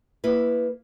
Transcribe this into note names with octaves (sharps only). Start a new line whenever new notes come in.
A#3 E4 B4